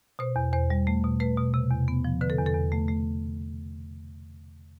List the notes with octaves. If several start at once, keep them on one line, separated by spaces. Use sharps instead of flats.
B2 C5
E2
E2 C5
G3
A3
B2
A3 B4
B2
C3
E2
B3
F3
D3 B4
A4
E2
A4
E2
A3
A3